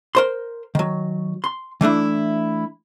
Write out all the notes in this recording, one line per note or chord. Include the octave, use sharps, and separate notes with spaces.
A#4 C5 C6
D#3 F#3
C6
E3 A3 D4 E4